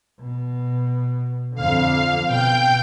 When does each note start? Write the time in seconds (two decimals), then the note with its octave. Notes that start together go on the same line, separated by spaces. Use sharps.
0.21 B2
1.55 F2 D3 F5
2.27 B2 G5 G6